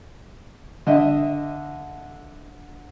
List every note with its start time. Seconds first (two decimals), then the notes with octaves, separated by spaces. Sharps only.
0.87 D3 D#5 E5